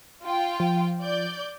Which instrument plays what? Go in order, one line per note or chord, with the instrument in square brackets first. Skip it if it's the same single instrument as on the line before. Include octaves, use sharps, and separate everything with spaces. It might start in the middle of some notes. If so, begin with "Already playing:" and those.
[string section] F4 G5
[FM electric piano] F3
[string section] D5 G6